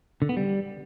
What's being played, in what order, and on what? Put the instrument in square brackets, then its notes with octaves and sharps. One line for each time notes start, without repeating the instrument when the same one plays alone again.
[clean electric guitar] D3
B3
G3